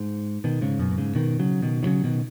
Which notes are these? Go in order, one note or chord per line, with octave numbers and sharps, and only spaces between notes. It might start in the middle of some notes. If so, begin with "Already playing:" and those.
Already playing: G#2
B2 D#3
G#2 C#3
F#2 B2
B2
G#2 C#3
B2 D#3
C#3 F#3
B2 D#3
D#3
C#3 F#3
B2 D#3